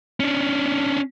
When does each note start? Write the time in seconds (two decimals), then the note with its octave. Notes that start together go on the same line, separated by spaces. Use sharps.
0.20 C#4 D4